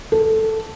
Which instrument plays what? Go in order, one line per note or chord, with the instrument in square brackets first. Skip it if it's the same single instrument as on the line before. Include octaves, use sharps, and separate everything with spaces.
[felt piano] A4